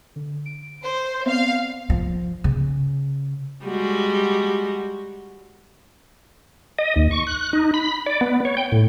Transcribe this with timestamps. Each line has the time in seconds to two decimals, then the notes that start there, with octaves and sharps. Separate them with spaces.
0.16 D3
0.46 D7
0.82 C5
1.26 B3 C4 D5 F5
1.90 F3
2.44 C#3
3.64 G3 G#3 F#4
6.79 D#5
6.96 D#2
7.11 C#6
7.27 F#6
7.53 D#4
7.74 B5
8.06 D5
8.21 B3
8.45 C#5
8.57 G5
8.72 A2